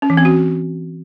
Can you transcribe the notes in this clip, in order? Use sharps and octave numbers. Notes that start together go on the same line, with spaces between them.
C#4
E3
C4
F#4